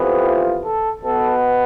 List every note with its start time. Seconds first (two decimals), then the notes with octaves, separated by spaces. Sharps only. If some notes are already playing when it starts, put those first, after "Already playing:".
Already playing: F2 C3 E3 B3
0.22 F4
0.62 A4
1.03 B2 B3 A4